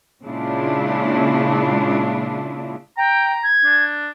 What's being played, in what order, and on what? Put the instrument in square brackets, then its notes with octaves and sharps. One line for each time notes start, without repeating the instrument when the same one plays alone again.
[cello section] A#2 C#3 G#3 D4 E4 F4
[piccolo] G5 [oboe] A#5
[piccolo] G#6
[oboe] D4